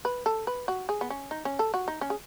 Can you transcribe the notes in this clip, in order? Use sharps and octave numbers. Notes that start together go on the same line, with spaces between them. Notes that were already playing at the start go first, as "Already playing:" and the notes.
B4
A4
B4
F#4
G#4
B3
C#4
D#4
C#4
A4
F#4
D#4
C#4
G#4